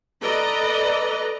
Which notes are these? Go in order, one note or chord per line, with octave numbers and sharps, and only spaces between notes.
A4 B4 D5 D#5 A#5